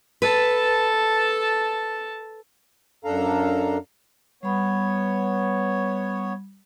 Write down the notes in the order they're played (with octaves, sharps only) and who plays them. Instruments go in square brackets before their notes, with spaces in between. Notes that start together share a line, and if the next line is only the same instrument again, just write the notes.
[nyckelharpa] A4 A5 [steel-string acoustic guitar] B4
[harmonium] F#2 D4 A4 F5 A#5
[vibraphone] G3 B5 [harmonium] B3 C#5